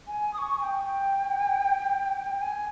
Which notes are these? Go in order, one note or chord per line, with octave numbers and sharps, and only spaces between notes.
G#5
D#6
C#6
G#5
G5
G5
G#5